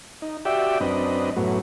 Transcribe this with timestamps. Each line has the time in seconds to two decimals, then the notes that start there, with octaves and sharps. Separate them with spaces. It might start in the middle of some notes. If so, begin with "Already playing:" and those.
0.22 D#4
0.45 F#4 G4 D5 E5 G5
0.80 F#2 C4 D4 B4 D#5
1.36 F#2 A2 F#3 B3